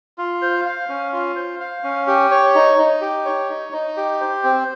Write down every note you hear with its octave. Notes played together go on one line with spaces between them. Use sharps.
F4
C5
F5
C#4
F4
C5
F5
C#4
G4
C#5
D#4
D#4
G4
C#5
D#4
D#4
G4
C5
C4